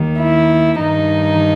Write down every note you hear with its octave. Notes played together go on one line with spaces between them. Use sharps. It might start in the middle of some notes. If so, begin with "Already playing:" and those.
Already playing: D#2 D#3
E4
G2 D#3 D#4